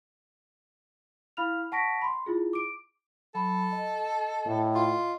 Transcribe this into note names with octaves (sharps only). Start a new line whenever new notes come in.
E4 F5 B5 F6 F7
F#5 A5 C#6 A#6 B6 D7
B5 C6
E4 F4 G#4
D6 D7
F#3 A4 B5
D#5
A2
F4